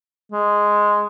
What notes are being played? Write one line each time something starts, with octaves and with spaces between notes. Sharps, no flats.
G#3